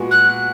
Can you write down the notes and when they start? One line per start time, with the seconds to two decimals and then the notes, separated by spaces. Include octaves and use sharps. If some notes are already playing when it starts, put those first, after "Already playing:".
Already playing: A#2 G#3 B3 F#4
0.11 F#6